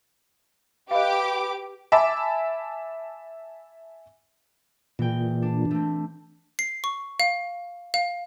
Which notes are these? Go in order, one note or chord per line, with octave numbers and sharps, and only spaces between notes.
G4 B4 D#5 F5 D6
E5 G#5 A5 B5 D6
A#2 E3 G#3 G5
D4
A3 C4
C7
C#6
F5
F5